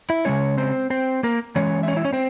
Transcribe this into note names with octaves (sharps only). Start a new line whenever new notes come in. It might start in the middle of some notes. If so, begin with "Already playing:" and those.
E4 E5
C#3 F3 G#3 C#4 C#5
C4 C5
C4 C5
A#3 A#4
E3 G#3 C#4 C#5
E5
C#4 C#5
E4 E5
C#4 C#5
C4 C5